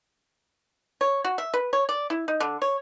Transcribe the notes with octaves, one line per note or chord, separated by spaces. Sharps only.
C#5
F#4
E5
B4
C#5
D5
E4
D#4
D3
C#5